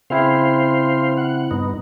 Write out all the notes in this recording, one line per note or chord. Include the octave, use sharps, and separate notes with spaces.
C#3 C4 E4 C5 F5
F#5
G2 B3 D#4